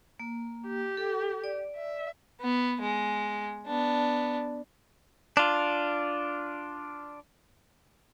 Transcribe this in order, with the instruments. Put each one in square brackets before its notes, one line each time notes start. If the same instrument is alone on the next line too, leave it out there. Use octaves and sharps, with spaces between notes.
[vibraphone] A#3
[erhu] G4
[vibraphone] A4
D5
[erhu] E5
[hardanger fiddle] B3
G#3
B3 D4
[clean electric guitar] D4 F4